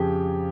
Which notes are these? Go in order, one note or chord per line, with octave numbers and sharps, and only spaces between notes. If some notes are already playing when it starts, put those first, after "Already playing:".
Already playing: F2 C#3 F3 G4 G#4